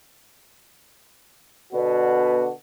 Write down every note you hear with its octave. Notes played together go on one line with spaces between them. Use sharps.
B2 D3 B3 D4 F#4 B4